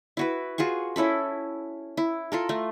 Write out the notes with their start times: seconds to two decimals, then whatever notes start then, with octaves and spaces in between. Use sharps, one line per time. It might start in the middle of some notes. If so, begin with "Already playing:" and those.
0.17 E4 F#4 B4
0.58 F4 F#4 G#4 C#6
0.96 C#4 E4 A4 B5
1.97 E4
2.32 F4 A4 A#4
2.49 A3